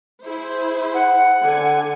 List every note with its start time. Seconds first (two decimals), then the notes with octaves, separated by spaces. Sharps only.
0.25 E4 G#4 C5
0.94 F#5
1.43 D3 G#5